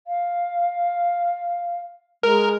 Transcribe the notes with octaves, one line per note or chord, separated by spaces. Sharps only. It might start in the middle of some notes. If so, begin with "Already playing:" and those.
F5
G#3 A#4